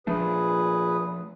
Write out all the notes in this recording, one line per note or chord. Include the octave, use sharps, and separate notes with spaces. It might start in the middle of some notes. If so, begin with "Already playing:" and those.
A#2 F3 A3 D4 G#4 B4